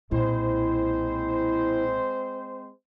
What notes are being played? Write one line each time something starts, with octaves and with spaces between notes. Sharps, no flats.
B1 A#2 G#3 C4 E4 C5